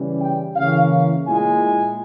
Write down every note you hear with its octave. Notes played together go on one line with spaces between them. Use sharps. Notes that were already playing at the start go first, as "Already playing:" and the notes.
Already playing: C#3 E3 G3 C#4
G5
C#3 E3 A#3 C#4 E4 F5
A#2 G#3 E4 G#5